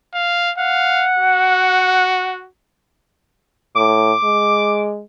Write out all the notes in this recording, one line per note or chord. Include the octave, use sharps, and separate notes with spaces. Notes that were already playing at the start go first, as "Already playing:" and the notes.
F5
F5 F#5
F#4
A2 D6
G#3